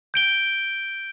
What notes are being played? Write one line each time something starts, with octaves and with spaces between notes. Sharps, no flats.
G6 D7 G7